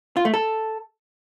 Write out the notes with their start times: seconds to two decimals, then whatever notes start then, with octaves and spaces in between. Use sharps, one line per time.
0.17 F4
0.25 A3
0.34 A4